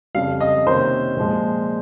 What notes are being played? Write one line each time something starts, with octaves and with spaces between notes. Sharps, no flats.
F2 C#3 G3 F5
D#5
C3 D#3 A#3 C#4 C5
A#2 F3 G#3